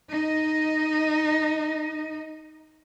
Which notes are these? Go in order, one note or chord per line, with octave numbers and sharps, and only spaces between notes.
D#4 D#5